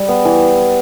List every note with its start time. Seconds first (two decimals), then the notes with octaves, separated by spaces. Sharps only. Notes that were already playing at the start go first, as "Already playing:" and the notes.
Already playing: G3
0.09 B3
0.25 E3